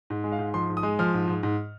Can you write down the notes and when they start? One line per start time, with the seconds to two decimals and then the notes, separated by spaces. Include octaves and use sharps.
0.10 G#2
0.24 G#3
0.32 F5
0.39 G#2
0.54 F3 C6
0.69 G#2
0.77 D#6
0.83 G#3
0.99 F3 F6
1.14 G#2
1.28 G#2
1.43 G#2